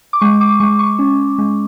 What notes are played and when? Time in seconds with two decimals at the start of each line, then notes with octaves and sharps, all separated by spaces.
0.13 D6
0.21 G#3 C#6
0.41 D6
0.60 G#3 C#6
0.79 C#6
0.99 C#4
1.38 G#3